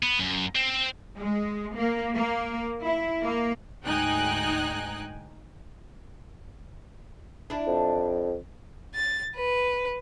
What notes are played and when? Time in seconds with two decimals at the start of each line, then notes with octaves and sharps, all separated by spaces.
0.03 B3
0.19 F#2
0.55 C4
1.19 G#3
1.77 A#3
2.15 A#3
2.82 E4
3.23 A#3
3.84 D2 G#2 D#4 G5 G#5 F#6
7.50 D4 E4
7.67 F2
8.94 A6
9.34 B4